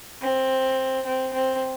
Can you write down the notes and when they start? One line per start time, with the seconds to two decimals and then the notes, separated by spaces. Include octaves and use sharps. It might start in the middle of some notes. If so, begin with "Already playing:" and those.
0.21 C4
1.06 C4
1.34 C4